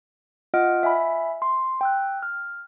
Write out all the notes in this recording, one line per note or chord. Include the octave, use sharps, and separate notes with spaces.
F4 D#5 F#5 F6 D7
E5 G#5 B5
C6
G5 E6 F#6
F6